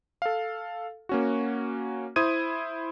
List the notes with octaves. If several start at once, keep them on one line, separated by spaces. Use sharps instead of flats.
A4 F5
A#3 C#4 F#4
E4 C5 D#6 G#6 D#7